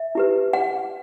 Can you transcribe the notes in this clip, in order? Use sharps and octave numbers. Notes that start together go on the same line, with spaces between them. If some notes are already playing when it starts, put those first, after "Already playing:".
Already playing: E5
E4 G4 B4
F#5